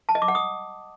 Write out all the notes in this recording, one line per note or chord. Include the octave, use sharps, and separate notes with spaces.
A5
D#5
D6
F#5
D#6